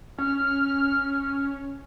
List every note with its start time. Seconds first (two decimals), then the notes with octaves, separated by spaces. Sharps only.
0.18 C#4 F6